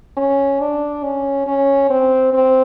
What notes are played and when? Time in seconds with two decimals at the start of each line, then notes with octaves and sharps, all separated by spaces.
0.17 C#4
0.60 D4
1.04 C#4
1.47 C#4
1.90 C4
2.33 C4